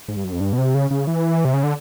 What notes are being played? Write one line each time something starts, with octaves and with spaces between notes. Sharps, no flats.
G#2
G2
F#2
F2
G2
B2
C3
C#3
C#3
E3
C3
C#3
D3